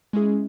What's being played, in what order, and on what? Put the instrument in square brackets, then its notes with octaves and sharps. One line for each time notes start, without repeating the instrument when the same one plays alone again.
[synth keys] G#3 C#4 E4 G#4